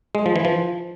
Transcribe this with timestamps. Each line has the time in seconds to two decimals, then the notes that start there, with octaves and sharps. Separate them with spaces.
0.15 G#3
0.26 F3
0.36 E3
0.45 F3